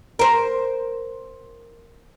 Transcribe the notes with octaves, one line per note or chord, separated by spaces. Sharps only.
A#4 C5